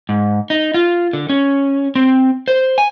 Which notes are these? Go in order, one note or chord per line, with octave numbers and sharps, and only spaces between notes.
G#2
D#4
F4
D3
C#4
C4
C5
G#5